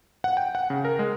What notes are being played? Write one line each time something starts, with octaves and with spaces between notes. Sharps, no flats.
F#5
G5
F#5
C#3
A#4
G#3